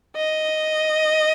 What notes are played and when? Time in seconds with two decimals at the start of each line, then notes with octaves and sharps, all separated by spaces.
0.17 D#5